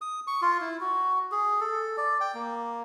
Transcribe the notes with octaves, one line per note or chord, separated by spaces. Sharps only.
D#6
C#6
F4
E4
F#4
G#4
A4
D5
G5
A#3